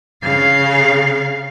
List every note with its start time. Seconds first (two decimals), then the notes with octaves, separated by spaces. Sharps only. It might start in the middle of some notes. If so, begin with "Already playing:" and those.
0.23 C#3 F5